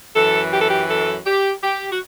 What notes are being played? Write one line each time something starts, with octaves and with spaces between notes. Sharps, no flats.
F#2 E3 A4
G4
A4
G4
A4
G4
G4
F#4